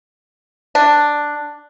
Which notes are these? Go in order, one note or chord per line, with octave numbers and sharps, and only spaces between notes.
D4